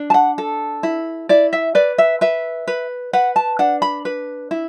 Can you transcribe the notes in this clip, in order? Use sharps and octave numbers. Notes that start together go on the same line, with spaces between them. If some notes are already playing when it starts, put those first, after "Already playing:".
Already playing: D4
A5
F#5
A4
E4
E4 D5
E5
B4 D5
E5
B4 E5
B4
B4 F#5
A5
D4 F#5
B5
B4
E4